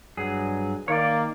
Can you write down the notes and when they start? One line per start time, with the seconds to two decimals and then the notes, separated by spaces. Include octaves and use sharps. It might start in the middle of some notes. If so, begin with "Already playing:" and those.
0.17 G2 F#3 G#4
0.88 D#3 A#3 C#5 D5